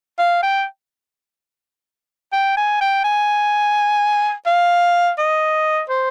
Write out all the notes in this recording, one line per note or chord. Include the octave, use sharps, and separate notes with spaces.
F5
G5
G5
G#5
G5
G#5
F5
D#5
C5